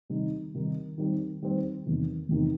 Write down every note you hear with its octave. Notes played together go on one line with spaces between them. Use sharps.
C3 D#3 G3 D#4
C3 D#3 G3 D#4
D#3 G3 C4
D#3 G3 C4
E2 C3 D#3
E2 C3 D#3